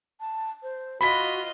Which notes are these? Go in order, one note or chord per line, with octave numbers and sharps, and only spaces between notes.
A5
C5
F4 F#4 D#5 B5 B6